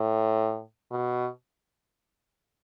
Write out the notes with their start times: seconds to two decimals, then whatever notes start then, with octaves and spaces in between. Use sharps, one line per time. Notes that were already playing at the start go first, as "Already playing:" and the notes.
Already playing: A2
0.91 B2